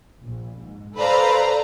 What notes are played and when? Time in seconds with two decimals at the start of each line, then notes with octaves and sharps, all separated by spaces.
0.22 A#1
0.59 G#2
0.96 A4 B4 C5 D5 F5 A#5